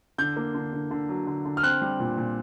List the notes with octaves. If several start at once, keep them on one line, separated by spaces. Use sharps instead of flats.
D3 G6
A#3
D3
D3
D3
F#3
D3
D3
F6
C4 F#6
G3
A#2
A#2